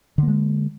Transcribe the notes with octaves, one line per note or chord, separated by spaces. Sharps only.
D3 G#3 A#3